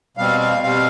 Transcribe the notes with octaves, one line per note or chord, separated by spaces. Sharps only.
B2 G3 C4 F5
F5
B2 G3 C4 F5